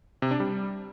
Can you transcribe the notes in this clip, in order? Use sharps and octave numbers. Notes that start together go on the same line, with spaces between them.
C3
D4
G3